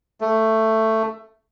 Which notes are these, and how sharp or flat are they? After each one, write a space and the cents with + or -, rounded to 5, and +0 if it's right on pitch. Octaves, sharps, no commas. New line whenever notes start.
A3 +10